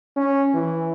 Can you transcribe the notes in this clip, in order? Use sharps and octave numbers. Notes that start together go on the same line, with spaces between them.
C#4
E3